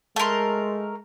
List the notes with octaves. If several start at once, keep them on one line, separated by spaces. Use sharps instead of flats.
G#3 A3 A#4 A5 C6